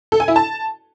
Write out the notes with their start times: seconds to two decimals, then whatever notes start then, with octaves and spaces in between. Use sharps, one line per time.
0.12 A4
0.20 G#5
0.28 E4
0.36 A5